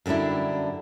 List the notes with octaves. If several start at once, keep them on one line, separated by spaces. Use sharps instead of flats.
F#2 D3 G3 D4 E4